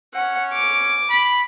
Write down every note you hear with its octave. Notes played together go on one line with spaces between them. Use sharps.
C#4 F#5
D6
B5